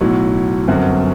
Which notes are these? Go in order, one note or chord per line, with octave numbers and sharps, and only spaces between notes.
B1 A2 F#3
G1 F#2 F#3 C4 F#4